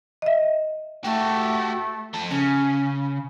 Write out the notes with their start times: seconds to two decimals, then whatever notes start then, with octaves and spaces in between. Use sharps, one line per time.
0.22 D#5 E5
1.04 A3 F#4 G4
2.13 F3 A4
2.30 C#3 C#4